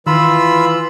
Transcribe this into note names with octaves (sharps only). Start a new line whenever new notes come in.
D#3 E3 F4 B5 E6